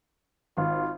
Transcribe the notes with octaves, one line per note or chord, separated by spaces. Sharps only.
G#1 F4